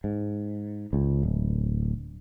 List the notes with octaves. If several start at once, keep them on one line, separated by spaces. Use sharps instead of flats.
G#2
C#2
D1